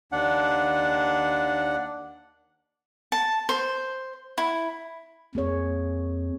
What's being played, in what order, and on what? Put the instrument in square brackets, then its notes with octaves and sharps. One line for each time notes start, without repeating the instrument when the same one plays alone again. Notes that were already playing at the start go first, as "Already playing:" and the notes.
[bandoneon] D#2 D4 F#5
[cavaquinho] A5
C5
E4
[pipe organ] F2 [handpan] A#3 G#4 C#5